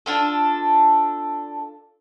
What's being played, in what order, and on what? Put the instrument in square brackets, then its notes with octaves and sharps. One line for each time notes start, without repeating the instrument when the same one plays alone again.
[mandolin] D4 F4 A4